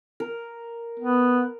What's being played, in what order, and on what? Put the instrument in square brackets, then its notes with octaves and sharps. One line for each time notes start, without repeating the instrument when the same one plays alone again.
[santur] A#4
[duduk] B3